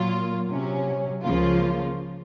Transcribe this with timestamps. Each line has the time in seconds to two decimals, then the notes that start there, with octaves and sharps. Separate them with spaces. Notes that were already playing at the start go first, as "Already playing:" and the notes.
Already playing: A#2 F#3 A#3 F4
0.48 C3 F#3 C#4
1.23 C#2 C#3 F3 A#3 F4